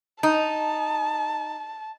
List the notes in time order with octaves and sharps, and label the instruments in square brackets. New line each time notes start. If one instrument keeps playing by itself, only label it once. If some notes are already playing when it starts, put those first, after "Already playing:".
[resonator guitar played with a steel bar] D#4 [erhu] A5